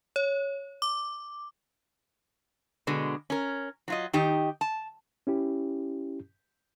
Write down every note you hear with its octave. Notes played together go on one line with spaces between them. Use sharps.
C#5
D6
B2 D3 G#3
C#4 A#4
F#3 F4 D#5
D#3 D#4 G4
A5
C#4 E4 G4